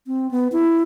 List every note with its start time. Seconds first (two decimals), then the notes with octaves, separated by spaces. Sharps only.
0.07 C4
0.31 B3
0.52 E4